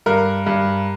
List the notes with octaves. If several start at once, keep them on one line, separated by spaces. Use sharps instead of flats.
G2 A#4
G2